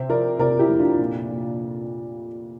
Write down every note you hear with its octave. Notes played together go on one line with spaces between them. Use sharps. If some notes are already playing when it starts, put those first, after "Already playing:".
Already playing: C3 C5 E5
F3 A#4 D5
C3 A#4 D5
E4 G4
F2
D4 F4
A#2
A#2